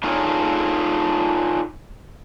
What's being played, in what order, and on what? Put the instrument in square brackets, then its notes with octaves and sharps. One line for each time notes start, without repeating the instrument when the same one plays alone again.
[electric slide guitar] D4 D#4 F4 G#4 A4 C#5